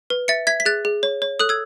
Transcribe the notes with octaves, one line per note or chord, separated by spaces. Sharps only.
B4
E5 A6 C#7
E5 G#6 B6
B6
G#4 F#6 A6
G#4
C#5
C#5
A4 D#6 F#6
E6 G#6